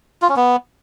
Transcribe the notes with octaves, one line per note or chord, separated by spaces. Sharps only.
F4
C#4
B3